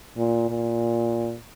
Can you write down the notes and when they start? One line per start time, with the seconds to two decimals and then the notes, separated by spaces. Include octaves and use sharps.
0.17 A#2
0.50 A#2